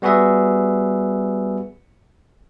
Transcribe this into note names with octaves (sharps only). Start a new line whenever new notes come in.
G3 B3 F#4 G#4 B4 E5